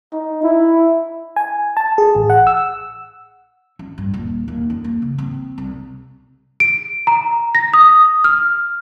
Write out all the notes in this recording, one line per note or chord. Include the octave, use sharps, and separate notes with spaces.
D#4
E4
G#5
A5
G#4
A1
F#5
E6
C#4
G2
D#1
D#2
F#2
A#3
C#3
C4
C2
D7
A#5
A#6
D#6
F6